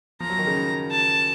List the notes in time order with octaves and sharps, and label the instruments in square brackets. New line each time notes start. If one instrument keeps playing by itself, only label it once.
[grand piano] F3 [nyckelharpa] A#5
[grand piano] F#3
D#3
C#3
[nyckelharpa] A5